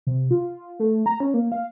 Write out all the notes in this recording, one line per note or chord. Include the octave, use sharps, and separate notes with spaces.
C3
F4
A3
A#5
C#4
A#3
F5